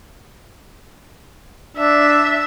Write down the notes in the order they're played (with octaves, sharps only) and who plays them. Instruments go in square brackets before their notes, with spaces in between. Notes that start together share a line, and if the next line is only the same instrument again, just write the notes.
[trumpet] D4 [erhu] E5